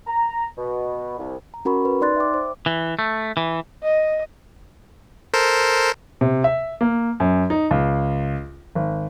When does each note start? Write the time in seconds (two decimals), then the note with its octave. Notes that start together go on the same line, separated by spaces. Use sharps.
0.06 A#5
0.58 B2
1.18 C2
1.54 A#5
1.65 C#4 F#4 A#4 B5 C#6
1.85 B4
2.01 D#4 D5 C6 F#6 A6
2.16 E5 G5 D6
2.34 C5
2.66 E3
2.99 A3
3.37 E3
3.83 D#5
5.33 A4 A#4 C5
6.21 C3
6.44 E5
6.81 A#3
7.20 F#2
7.50 D#4
7.71 C#2
8.75 G#1